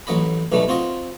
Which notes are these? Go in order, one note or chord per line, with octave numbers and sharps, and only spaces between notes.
A1 F#3 D#5 B5
B1 B2 G3 A3
C4 F4 F#4 D#5